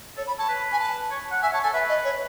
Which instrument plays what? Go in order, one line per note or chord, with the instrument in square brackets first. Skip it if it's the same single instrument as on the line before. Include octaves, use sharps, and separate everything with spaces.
[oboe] A4 [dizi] C#5
[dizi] B5
[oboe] C#5 [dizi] A5
[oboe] B4
[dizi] G#5
A5
[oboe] C#5
F#5
[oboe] E5 [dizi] G#5
[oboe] C#5 [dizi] A5
[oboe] A4 [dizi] G#5
[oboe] B4 [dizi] E5
[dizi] D#5
C#5